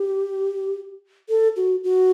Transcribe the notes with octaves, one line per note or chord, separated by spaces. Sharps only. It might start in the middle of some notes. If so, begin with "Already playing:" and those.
Already playing: G4
A4
F#4
F#4